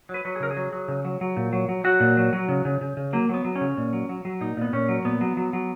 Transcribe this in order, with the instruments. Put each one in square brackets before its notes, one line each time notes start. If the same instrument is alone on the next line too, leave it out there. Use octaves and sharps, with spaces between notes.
[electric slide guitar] F#3
B4
F#3
G#4
C#3 A#4
G#4
F#3
F#3
C#3
F#3
F#3
A#2
F#3
F#3
F#3 F#4
A#2
F#3
F#3
C#3
C#3
C#3
C#3
F#3 A#3
F#3 B3
F#3
C#4
C#3
A#2
F#3
F#3
F#3
A#2 D#4
A#2 B3
A#2 C#4
F#3
A#2 B3
F#3
F#3
F#3